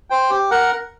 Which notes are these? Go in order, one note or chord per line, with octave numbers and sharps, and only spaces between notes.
C5 G5
G4
A#4 F#5